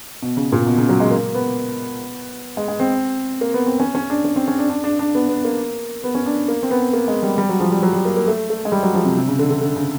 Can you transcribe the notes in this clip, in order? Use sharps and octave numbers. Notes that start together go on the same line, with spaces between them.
B2
C#3
A#2
B2
C#3
F#3
G#3
A#3
B3
G#3
G#3
C4
A#3
B3
C4
C#4
C#4
D4
C#4
C4
C#4
D4
D4
D4
D4
B3
B3
A#3
B3
C#4
D4
A#3
C4
B3
A#3
G#3
G3
G3
F#3
F3
G3
F#3
G3
A#3
A#3
A3
A3
G#3
G3
F#3
F3
C3
C3
C#3
D3
D3
D3
C#3